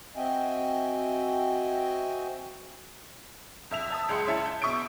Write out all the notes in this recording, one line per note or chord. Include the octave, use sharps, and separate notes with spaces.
C4 F#4 D#5 E5 G5 G#5
F2 E5 F7
E5 A5 D#6
C#2 G#3 C6 C#7
C#4 E4 E5 A5
G6
B2 E5 C#6 D#6 G6 D7